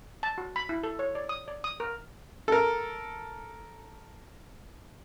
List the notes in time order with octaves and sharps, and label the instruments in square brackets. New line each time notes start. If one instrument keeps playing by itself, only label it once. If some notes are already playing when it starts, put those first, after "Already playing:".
[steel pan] A5
F#4
B5
E4
A4
C#5
D5
D#6
D5
D#6
A#4
[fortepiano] A4 A#4